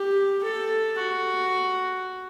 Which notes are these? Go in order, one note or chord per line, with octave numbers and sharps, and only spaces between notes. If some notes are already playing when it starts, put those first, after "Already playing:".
Already playing: G4
A4
F#4